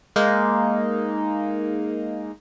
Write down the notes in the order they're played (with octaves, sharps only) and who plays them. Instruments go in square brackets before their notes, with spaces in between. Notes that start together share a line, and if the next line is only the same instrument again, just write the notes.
[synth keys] G#3 A#3 D#4